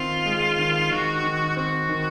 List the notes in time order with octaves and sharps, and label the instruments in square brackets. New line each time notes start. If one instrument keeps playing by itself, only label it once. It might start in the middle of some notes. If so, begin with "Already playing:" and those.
Already playing: [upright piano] D#3 C4 [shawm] F4
[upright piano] G#3
D#3
[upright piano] D#3 [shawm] F#4
[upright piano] D#3
[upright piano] C4 [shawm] F#4
[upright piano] D#3